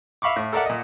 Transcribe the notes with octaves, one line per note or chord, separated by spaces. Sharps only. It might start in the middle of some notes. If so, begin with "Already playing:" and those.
E5 F5 B5 C#6 D6
A2
A4 A#4 D5 E5 F#5
A#2 D#5